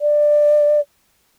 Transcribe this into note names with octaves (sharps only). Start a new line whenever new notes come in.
D5